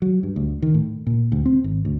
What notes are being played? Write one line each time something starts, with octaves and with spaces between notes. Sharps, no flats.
F#3
G2
D2
D#3
A2
A#2
D2
C4
G#1
D2